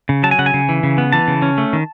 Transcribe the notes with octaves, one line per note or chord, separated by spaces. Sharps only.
C#3
F#3 A5
G#5
C#3 F#5
G#5
C#3
E3
C#3
B3
E3 A5
C#3
C#4
A3
D#3